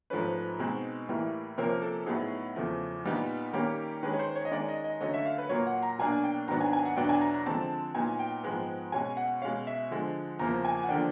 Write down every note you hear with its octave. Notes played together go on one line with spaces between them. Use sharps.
G#2 F3 A3 C#4 B4
B2 G#3 C4 D#4
A2 E3 G3 A#3
C3 F3 A#3 C#4 A#4
A4
A2 F#3 B3 D#4 G#4
E2 C#3 F3 A3
A#2 G3 B3 D#4
D#3 G3 A#3 C#4 G4
D#3 G#3 C#4 B4
C#5
C5
C#5
D#5
D#3 G#3 C#4 D5
D#5
D#5
D3 F#3 A3 C#4 D#5
E5
F5
B4
A#2 F#3 A#3 C#5
F#5
A#5
B2 F#3 A#3 D4 G#5
G5
G#2 D#3 F#3 B3 D4 A#5
G#5
G#5
F#5
E2 B2 F#3 B3 D4 G5
G#5
A#5
A#5
D3 F3 G#3 C4 A5
A#2 F#3 B3 D#4 G#5
G5
G#2 F3 G#3 B3
B2 G#3 C#4 G#5
F#5
B2 G#3 C#4 F5
E5
D3 F3 G#3
E2 C#3 F3 A#3 A#5
G#5
F#5
D3 F3 A#3 D4 G5